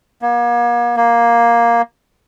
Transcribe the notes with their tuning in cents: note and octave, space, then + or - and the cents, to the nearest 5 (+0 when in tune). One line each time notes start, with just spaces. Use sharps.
A#3 +40
A#3 +10